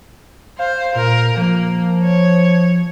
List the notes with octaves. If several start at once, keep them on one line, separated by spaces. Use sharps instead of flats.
C5 F5
A#2 A#4
F3 A#3
C#5